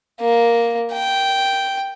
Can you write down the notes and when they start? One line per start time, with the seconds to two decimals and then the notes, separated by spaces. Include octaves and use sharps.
0.20 A#3
0.93 G5